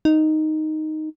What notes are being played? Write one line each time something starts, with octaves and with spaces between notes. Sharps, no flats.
D#4